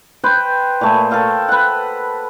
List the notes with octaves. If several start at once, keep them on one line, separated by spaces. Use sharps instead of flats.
B4 C5 G5
A#2 A3 G#5
A4 A#4 F5 G5
B4 F#5